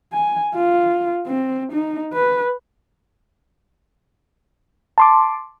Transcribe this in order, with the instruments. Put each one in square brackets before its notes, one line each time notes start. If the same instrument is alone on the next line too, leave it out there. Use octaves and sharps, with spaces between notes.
[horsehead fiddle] G#5
F4
C4
D#4
B4
[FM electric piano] A5 C6 D6